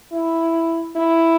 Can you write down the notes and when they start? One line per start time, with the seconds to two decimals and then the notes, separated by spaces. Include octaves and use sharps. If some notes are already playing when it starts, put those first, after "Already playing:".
0.12 E4
0.96 E4